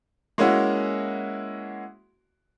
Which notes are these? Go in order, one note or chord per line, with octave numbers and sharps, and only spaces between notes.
G#3 A#3 C#4 E4 F#4